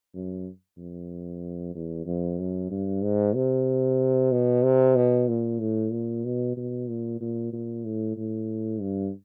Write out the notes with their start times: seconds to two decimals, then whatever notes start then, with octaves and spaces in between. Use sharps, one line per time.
0.14 F#2
0.77 F2
1.75 E2
2.06 F2
2.39 F#2
2.70 G2
3.02 G#2
3.35 C3
4.31 B2
4.63 C3
4.96 B2
5.28 A#2
5.59 A2
5.91 A#2
6.24 B2
6.56 B2
6.89 A#2
7.21 A#2
7.52 A#2
7.85 A2
8.17 A2
8.81 G2